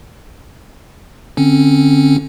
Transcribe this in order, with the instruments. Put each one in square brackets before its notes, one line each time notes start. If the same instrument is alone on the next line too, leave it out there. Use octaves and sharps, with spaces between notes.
[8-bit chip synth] D3 C4 C#4